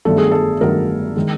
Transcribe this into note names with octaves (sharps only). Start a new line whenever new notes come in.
G1 G2 D#3 F#3 A3 A4
G#4
A4
G1 G2 D#3 F#3 A3 A#4
D#3 G#3